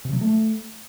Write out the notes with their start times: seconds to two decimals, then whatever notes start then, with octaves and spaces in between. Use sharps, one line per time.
0.05 C3
0.13 F#3
0.21 A3